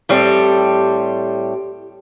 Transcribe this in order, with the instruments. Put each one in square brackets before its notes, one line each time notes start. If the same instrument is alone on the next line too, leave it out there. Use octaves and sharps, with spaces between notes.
[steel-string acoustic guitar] A2 G3 C4 G4 A4